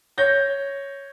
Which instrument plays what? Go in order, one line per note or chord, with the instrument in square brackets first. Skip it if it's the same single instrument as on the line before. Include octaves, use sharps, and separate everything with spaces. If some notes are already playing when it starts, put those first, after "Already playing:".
[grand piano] C#5 G6 A#6